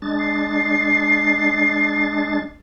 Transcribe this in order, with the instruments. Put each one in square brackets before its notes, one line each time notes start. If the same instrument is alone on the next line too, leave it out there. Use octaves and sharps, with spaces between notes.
[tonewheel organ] G#3 D4 A6
[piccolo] C7